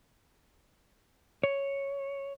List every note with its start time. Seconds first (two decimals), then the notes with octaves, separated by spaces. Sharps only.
1.43 C#5